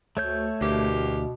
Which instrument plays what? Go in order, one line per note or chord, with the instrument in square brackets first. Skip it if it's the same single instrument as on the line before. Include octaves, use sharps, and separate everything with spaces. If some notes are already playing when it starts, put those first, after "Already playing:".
[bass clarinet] D2 [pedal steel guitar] A3 C#5 G6
[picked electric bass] D2 [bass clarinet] B2 [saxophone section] E3 A#3 G4